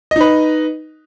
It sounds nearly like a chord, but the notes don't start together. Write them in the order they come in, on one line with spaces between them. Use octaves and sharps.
D#5 D#4 B4